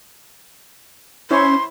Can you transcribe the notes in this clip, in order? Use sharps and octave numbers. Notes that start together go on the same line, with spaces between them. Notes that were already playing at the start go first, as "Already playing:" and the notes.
C#4 E4 C5 C#5 C6